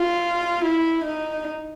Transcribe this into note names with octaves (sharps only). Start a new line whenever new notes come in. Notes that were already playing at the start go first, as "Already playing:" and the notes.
Already playing: F4
E4
D#4